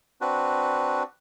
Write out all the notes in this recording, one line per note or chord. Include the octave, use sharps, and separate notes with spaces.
C4 D4 F#4 B4